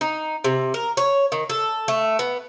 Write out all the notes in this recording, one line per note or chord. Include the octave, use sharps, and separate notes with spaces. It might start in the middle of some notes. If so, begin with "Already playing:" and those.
D#4
C3
A#4
C#5
D#3
A4
A3
B3